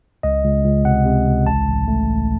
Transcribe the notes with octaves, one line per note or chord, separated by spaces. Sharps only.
C#2 D#5
C#2
C#2
C3 F#5
C3
C#2
A1 A5
A1
A3
A1